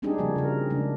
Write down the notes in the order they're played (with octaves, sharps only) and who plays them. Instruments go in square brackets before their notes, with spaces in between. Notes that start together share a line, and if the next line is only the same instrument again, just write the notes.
[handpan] G3 C4 D4 D#4 G4 G#4
C#3 F3 G3 A#3 F#4
C#3 A#4
C#3 G#3 D4